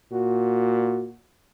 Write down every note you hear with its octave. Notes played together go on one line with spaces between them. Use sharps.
A#2 F#4